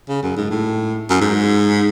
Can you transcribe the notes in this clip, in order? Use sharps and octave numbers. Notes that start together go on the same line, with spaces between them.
C#3
F#2
G#2
A2
F#2
G#2